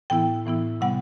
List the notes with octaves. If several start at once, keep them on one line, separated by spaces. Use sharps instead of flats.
A2 E3 B3 E4 G5
A2 E3 B3 E4
C3 G3 B3 F#5